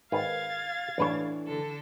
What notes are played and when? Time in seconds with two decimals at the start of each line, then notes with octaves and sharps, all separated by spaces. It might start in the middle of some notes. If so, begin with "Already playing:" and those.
0.12 G#1 D#3 B4 F5 G#6 A6
0.98 A1 E3 A3 D4 B4 C#5
1.46 D3 A4